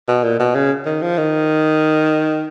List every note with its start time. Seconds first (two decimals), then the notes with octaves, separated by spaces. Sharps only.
0.08 B2
0.24 A#2
0.39 B2
0.55 C#3
0.86 D#3
1.02 F3
1.18 D#3